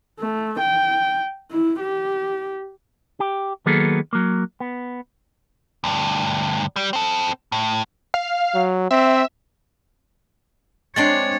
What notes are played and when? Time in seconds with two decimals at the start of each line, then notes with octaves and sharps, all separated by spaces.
0.20 A3
0.60 G5
1.52 E4
1.81 G4
3.20 G4
3.66 D#3 F#3 A#3 B3 G#4 A4
4.13 F#3 A#3
4.60 B3
5.84 D2 G2
6.76 G3
6.93 C4 A4
7.52 A2
8.14 F5
8.55 F#3
8.91 C4 E5
10.96 G#3 C4 D4 C#5 A6